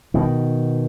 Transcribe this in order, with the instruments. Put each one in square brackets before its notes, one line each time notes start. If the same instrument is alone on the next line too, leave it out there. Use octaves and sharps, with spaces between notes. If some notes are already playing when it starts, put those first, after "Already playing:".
[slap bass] B2 D#3